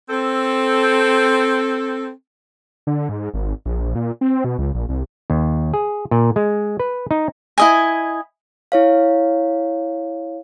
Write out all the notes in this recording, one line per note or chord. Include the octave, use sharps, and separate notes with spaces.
C4 A4
D3
G#2
G#1
A#1
A#2
C4
B2
C#2
A#1
C2
D#2
G#4
A#2
G#3
B4
D#4
E4 D#5 G#5
E4 C#5 F5